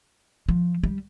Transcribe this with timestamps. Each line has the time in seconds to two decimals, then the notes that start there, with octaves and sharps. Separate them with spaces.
0.49 F3
0.83 G3